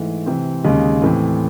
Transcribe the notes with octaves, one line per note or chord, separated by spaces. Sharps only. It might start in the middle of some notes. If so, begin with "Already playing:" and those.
Already playing: G#2 E3 A3
C3 E3 C4
D#2 C#3 G#3
A2 E3 C4